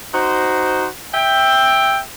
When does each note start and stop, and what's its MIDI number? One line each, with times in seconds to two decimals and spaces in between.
0.13 0.86 63
0.13 0.86 66
0.13 0.86 72
1.13 1.99 76
1.13 1.99 79